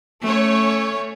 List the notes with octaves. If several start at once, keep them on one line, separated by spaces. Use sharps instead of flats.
A3 C#4 C#5